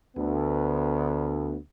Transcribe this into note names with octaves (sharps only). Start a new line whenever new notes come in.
D2 B3